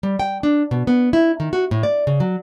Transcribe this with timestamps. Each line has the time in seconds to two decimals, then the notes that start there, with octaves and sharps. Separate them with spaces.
0.03 G3
0.19 G5
0.43 D4
0.71 B2
0.87 B3
1.13 E4
1.40 D#3
1.53 F#4
1.71 A2
1.83 D5
2.07 C#3
2.20 F#3